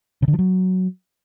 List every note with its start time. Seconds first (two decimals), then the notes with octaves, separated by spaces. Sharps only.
0.22 C#3
0.28 D3
0.33 F3
0.39 F#3